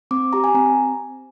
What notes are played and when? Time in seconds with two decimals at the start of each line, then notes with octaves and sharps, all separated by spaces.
0.11 C4 D6
0.33 G4 A#5
0.44 G#5
0.54 C4 A#5